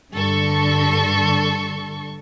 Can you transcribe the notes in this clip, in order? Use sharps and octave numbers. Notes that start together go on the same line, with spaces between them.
G2 D3 A4 C#6